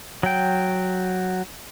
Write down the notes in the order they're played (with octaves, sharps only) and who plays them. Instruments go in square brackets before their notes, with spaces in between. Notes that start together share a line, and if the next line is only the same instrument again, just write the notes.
[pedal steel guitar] F#3 G5